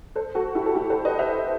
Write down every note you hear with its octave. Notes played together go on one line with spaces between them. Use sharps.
A4 C5
F#4 A4
E4 G4
A4
E4 G4
A4 C5
B4 D#5
C5 E5